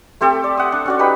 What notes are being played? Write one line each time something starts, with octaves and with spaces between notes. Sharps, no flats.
A3 C4 G4 A4
D5
F#5 D#6
D4
C#4 F#4 D5
D#4 G4 B4 B5